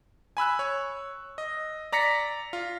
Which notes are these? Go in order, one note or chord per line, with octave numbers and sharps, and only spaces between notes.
G#5 B5 E6 F#6
C#5
D#5
D5 A#5 A#6 B6 C#7
F4